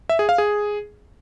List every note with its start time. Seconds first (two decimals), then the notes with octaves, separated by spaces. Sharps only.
0.09 E5
0.19 G#4
0.29 F5
0.38 G#4